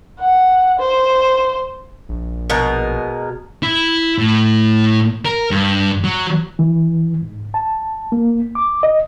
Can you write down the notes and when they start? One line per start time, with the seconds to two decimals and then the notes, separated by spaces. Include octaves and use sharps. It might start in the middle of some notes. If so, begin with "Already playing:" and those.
0.20 F#5
0.80 C5
2.09 A#1
2.50 B2 G#3 A#4
3.63 E4
4.18 A2
5.25 A#4
5.51 G2
6.04 F#3
6.59 E3
7.22 G#2
7.54 A5
8.12 A#3
8.55 D6
8.83 D#5